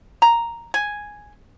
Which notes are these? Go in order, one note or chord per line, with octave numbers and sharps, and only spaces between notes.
A#5
G#5